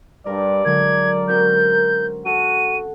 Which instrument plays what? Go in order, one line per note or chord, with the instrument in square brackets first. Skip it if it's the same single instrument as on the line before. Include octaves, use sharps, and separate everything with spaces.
[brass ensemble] G2 G3 [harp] A#4 [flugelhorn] D5
[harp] D3 F#3 G#3 [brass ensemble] A#4 [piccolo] G#6
[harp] C4 C#4 F#4 [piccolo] G6
[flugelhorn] F#4 [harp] A4 F#5 [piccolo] D#7